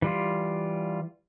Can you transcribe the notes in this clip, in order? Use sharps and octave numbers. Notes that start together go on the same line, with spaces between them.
E3 G3 F4